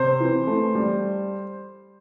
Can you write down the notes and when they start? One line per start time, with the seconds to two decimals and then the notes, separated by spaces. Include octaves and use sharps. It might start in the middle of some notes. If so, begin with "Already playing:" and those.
Already playing: C3 C5
0.21 E3
0.47 A3
0.75 G3